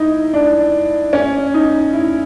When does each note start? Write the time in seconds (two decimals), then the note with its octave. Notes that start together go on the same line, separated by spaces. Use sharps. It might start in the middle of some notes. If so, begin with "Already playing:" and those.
Already playing: D#4 E4
0.34 D4
1.13 C#4
1.54 D#4
1.93 E4